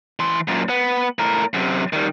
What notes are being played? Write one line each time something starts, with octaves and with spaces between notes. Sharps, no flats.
E3 C6
F#2 A#2
B3
A2 A#4
F#2 C3
D#3 G3